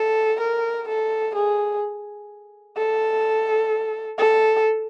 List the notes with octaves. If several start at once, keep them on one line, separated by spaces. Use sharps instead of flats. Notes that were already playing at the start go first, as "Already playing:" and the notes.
Already playing: A4
A#4
A4
G#4
A4
A4